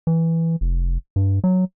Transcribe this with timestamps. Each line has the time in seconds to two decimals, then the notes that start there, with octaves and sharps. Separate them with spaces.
0.07 E3
0.61 F1
1.16 G2
1.44 F#3